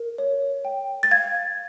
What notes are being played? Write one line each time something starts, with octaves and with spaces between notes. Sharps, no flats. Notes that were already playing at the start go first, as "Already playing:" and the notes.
Already playing: A#4
C#5
G5
A6
F5 G#6